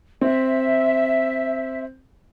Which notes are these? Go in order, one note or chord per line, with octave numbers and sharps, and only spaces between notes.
C4 E5